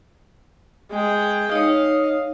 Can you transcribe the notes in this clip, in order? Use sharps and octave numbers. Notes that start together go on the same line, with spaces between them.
G#3 G5
D#4 C#5 D#5 F5